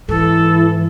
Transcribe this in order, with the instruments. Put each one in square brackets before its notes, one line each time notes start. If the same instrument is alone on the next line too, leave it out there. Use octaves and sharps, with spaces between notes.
[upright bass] G#2 [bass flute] E3 [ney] A4